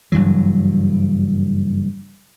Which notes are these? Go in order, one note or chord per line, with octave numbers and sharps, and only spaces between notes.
F#1 G2 E3 F#3